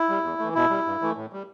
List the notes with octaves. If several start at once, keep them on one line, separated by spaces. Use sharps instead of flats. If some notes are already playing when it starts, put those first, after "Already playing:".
Already playing: E4
G3
E2
E3 A3
B2 E4
G3
G2
E3 A3
A2
G3